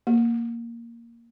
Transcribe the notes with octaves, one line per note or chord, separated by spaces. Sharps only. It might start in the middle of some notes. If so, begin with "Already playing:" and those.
A#3